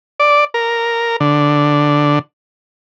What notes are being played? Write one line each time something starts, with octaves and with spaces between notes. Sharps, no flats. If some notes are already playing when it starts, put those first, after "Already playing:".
D5
A#4
D3